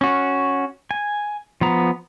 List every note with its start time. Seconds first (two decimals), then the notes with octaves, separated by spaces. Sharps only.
0.01 C#4 F#4
0.91 G#5
1.61 F3 B3 A#5